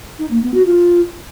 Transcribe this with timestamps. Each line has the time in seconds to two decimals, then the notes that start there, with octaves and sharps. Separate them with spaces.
0.19 D#4
0.31 A#3
0.42 B3
0.54 F#4
0.66 F4